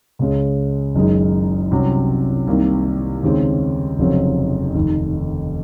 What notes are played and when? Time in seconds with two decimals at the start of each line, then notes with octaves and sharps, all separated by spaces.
0.19 C#2 C#3 G#3
0.95 F#1 F#2 D#3 G#3 D#4
1.71 C2 C3 F#3 C#4
2.47 C2 C3 D#3 A#3
3.23 D#2 C#3 G#3 C4
3.99 F1 F2 C#3 F#3 C4
4.75 F1 D#2 D#3